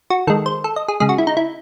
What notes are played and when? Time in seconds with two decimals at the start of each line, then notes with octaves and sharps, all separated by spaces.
0.10 F#4
0.27 D#3 G#3 A4
0.46 C5
0.64 A4
0.76 D#5
0.88 G#4
1.00 C#3 G#3 G#4
1.09 F#4
1.18 E4
1.27 D#4
1.37 E4